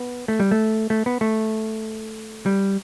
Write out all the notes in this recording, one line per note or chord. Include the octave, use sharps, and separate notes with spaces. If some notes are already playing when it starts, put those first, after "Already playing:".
Already playing: B3
A3
G3
A3
A3
B3
A3
G3